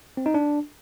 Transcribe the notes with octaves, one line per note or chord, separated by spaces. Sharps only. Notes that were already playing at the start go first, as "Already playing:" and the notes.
C4
D#4
D4